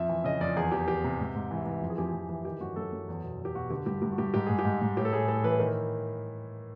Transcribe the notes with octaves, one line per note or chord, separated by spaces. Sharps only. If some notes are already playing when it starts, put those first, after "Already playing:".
Already playing: F2 E5
E3
C#3 D#5
F2 D5
E2 G#4
E2 G4
E2 G4
C3
G#2
G#2
E3
E3
F2
G#4
F2 G4
F2
E3
D#3 G4
F#2 F#4
F#2 A4
F#2
E2
B2
E2
G4
B2 F#4
D3 G4
G2 G4
G2 G4
F#4
G2 G4
G#2 G4
G#2 G#4
G4
G#2
G#2
A2 G4
A4
A2 G#4
A2 A4
E3 B4
D#3 A#4